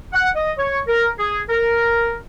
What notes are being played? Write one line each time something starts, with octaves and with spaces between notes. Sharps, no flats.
F#5
D#5
C#5
A#4
G#4
A#4